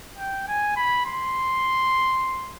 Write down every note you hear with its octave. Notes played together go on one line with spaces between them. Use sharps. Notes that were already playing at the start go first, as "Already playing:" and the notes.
G5
G#5
B5
C6